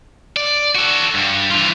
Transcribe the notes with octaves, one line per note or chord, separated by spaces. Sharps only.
D5
F#4 A4
G2
E3 F4